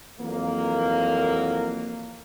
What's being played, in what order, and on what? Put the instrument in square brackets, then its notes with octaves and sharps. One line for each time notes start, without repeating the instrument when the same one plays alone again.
[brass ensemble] F2 E3 F#3 A#3